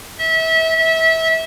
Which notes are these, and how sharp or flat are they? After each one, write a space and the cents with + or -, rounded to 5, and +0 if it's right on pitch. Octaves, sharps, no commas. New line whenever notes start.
E5 -30
E5 -25